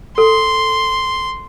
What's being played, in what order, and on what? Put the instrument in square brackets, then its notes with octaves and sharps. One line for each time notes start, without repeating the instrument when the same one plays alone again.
[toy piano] A4 [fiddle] C6